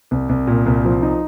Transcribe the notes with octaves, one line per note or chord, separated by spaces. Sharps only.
C2
C2
A#2
C2
F3
D#4